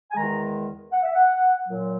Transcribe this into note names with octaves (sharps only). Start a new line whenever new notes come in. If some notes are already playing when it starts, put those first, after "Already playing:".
G#5
E2 D#3 G#3 A#5
F#5
E5
F#5
A#2 F#3